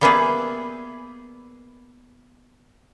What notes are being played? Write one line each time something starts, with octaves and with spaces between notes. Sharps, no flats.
G3 A#3 B3 E4 G#4 B4